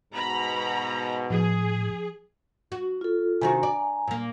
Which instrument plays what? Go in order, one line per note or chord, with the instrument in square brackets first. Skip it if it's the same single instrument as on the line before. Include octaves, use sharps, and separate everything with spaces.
[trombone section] G#2 B2 [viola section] A#5 B5
[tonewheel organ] A2 [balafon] F3 [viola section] G#4
[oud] F#4
[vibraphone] F4 A4
[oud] C3 D#3 F#4 [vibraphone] G#5 A#5
[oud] D5
A#2 A#3